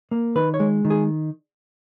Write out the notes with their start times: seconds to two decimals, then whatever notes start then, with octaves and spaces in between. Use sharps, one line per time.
0.11 A#3
0.35 D#3 B4
0.54 C#5
0.60 G#3
0.85 D#3
0.90 G#4